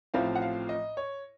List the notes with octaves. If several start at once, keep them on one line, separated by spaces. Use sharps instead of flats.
A1 A2 F3 C4 F5
F#5
F5
D#5
C#5